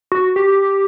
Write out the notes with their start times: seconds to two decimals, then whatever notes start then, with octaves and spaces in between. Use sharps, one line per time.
0.12 F#4
0.36 G4